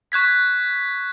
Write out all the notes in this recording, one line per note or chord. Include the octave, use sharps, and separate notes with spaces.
C#6 F#6 G#6 B6